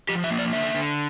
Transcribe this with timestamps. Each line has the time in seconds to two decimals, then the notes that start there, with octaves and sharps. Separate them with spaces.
0.09 F3 G4
0.24 E5
0.31 A#3
0.39 D5
0.53 D3 E5
0.75 D3